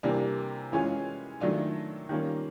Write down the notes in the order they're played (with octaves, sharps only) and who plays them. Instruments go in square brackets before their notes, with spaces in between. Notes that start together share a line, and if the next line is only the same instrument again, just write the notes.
[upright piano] C3 E3 G3 A#3 D4
E3 G#3 C#4 F4 G#4
D#3 F#3 A3 D4 F4
D#3 G3 A#3 C#4 F4